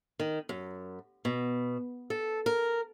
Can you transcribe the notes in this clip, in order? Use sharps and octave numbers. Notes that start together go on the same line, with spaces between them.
D#3
F#2
B2
A4
A#4